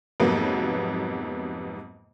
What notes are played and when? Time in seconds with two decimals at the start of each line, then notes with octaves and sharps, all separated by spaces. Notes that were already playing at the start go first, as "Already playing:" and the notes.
0.20 F2 G#2 C3 F#3 A#3 B3